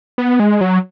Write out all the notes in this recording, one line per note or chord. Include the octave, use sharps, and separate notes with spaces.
B3
G#3
F#3